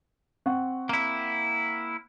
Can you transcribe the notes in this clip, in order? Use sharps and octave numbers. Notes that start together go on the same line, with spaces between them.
C4 F#5 C#6
A#3 E4